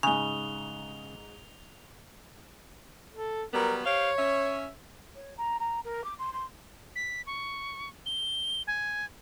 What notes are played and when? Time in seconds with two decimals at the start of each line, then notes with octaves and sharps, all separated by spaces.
0.03 G#2 C#3 D#4 G#5 F#6 F7 G7
3.13 A4
3.53 F#3 G3 B3 A#4
3.84 G4 C5 C#5 F5
4.17 C#4 E5
5.15 C#5
5.37 A#5
5.60 A#5
5.84 A#4
6.04 D6
6.19 C6
6.33 C6
6.96 B6
7.27 C#6
8.06 G7
8.67 G#5